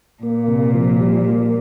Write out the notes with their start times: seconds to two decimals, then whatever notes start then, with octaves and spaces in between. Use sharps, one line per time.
0.23 A#2 A#3
0.48 C3
0.74 F3
1.00 G3
1.25 A#3